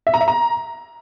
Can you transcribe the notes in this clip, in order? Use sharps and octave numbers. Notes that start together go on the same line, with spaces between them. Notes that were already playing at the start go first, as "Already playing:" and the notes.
E5
A#5
E5
A#5